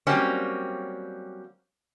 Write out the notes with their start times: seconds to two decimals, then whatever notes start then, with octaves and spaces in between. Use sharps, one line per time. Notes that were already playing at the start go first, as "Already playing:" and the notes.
0.07 F#3 G3 A#3 C4 C#4